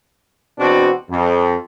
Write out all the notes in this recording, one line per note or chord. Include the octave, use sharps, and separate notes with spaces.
E2 B2 C4 D4 F#4
F2